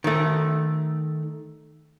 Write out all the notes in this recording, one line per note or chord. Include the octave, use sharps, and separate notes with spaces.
D#3 A3